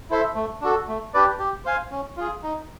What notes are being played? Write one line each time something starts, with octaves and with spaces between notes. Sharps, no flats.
E4 A4 C5 E5
A3
D4 F#4 A4
A3
D4 G4 B4 D5
G4
C5 F5 G#5
C#4
F4 G#4
D#4